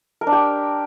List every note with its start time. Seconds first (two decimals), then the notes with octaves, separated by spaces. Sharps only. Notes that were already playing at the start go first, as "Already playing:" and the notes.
0.21 A#4
0.27 D4
0.32 G4